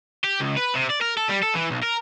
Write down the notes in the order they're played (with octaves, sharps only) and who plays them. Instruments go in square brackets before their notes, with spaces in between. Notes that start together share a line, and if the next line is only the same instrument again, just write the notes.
[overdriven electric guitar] G4
C#2
B4
C3
D5
A#4
A4
G3
A4
E3
B1
A#4